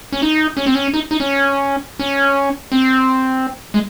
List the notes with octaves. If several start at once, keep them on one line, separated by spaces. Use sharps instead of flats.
C#4
D#4
C#4
C4
C#4
D#4
D#4
C#4
C#4
C4
G#3